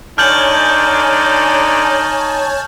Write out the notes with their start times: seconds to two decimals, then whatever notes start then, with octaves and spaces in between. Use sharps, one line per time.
0.18 D3 D#4 C#5 G#5 A5 F6 G6 F#7